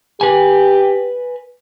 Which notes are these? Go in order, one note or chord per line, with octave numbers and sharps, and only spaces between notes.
G4 B4 G#5